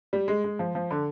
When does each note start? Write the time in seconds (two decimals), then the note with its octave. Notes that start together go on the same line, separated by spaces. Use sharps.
0.13 G3
0.28 G#3
0.44 G#3
0.59 F3
0.75 F3
0.91 D3